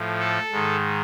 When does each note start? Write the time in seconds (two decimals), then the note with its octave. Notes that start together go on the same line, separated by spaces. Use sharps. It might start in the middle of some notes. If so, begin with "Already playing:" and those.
Already playing: A2 F3
0.20 A4
0.52 G#2 D#3